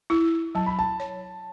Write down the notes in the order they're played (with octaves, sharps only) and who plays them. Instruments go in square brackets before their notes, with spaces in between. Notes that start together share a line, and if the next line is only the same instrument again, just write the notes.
[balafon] E4 [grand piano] E6
[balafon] F#3 [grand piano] A5
[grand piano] B5
A5
[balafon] C#5